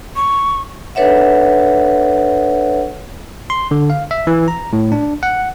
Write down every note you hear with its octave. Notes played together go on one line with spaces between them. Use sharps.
C#6
D4 A4 B4 C#5 E5 F#5
C6
D3
F5
E5
E3
A#5
A2
D4
F#5